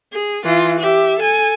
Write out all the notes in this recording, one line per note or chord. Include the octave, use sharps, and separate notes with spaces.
G#4
E3 F4
G4 E5
A4 G#5